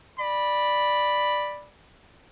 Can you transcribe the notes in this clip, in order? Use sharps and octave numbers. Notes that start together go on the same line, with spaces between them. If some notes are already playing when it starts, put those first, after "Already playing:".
D5 B5